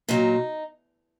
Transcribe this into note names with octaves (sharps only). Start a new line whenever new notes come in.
A#2 F#3 D#4